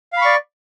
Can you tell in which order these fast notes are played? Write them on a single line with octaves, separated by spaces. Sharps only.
F5 B5 C#6 D5